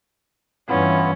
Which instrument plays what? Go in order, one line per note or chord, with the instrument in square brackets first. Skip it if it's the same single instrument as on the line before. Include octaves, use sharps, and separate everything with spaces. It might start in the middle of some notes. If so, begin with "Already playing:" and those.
[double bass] G2 E3 [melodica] B3 E4 F4 [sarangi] C#4